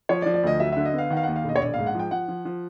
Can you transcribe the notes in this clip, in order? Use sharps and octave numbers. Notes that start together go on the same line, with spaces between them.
F3 C#5
D5
F3
D5
D2 D#5
F#3 E5
D3 E5
D#5
B3 F5
D#3 F#5
F5
D#2 F#5
F5
E1 D#5
C#5
A#1 D5
G#2 F5
F#5
F3 G5
F3 F#5
F3
F3